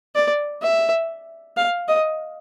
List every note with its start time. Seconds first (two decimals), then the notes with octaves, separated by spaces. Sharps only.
0.15 D5
0.62 E5
1.57 F5
1.88 D#5